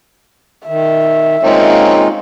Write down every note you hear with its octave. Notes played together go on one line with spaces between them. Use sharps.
D#3 E5
G#3 A#3 C4 C#4 D#4 F4